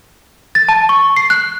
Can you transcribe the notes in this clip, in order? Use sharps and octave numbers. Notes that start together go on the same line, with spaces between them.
A6
A5
C#6
C7
F#6